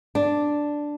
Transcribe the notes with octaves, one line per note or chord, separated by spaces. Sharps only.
D4